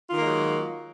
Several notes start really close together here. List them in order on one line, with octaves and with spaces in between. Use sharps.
F4 D#3 A#3 G#3 F#3